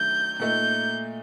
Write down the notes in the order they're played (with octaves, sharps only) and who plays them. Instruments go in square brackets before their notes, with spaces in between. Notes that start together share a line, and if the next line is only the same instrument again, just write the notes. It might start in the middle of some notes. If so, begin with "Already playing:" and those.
Already playing: [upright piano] D#3 F#3 A3 D4 [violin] G6
[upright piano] A#2 A3 D#4 [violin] G6